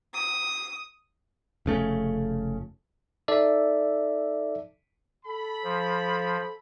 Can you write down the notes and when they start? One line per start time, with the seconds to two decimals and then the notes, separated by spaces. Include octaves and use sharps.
0.13 D#6
1.66 F1 C#3 A3 C#4
3.28 D#4 A4 D5 E5
5.25 A4 B5
5.64 F3